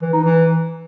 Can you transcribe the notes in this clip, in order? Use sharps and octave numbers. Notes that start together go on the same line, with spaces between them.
E3
D#4
E3